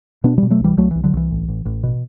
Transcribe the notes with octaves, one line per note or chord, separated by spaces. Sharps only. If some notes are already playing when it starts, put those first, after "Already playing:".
B2 B3 D4
E3 G3
B2
F#3 A3
C2 E3 G3
C2 F#3 A3
E3
C2
D3 F#3
C2 E3
A1
A1
A1
B2